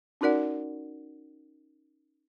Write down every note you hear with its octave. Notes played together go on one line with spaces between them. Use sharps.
C#4 D#4 F#4 A#4 D5 F#5